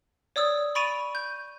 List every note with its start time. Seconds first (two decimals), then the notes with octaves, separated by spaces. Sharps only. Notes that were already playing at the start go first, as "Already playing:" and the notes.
0.36 C#5 D5 D#6 E6
0.75 B5 C#6 A6 D7 D#7 F7
1.15 G6